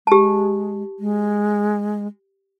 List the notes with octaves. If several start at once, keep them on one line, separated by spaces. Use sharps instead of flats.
G#3 G4 A5
G#3